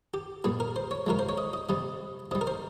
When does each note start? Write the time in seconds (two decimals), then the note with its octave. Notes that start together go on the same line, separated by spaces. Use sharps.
0.14 G4
0.44 A#2 G3 G#4
0.60 A#4
0.76 C5
0.91 C#5
1.07 C3 F3 G#3 A#4
1.19 C5
1.29 C#5
1.38 D#5
1.53 D#5
1.69 C3 G3 D#5
2.31 C3 G3 D#5
2.41 A#4
2.47 C5